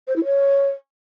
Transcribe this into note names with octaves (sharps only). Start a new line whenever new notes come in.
C5
E4
C#5